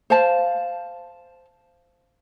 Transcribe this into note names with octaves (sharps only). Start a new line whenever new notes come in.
C5 F5 A5